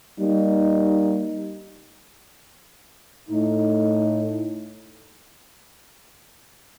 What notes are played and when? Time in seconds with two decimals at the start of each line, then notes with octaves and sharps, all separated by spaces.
0.19 G3 A#3 D#4
3.29 A2 A3 D#4